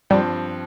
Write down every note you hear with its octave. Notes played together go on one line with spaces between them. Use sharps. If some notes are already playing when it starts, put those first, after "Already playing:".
G2 F3 G3 C4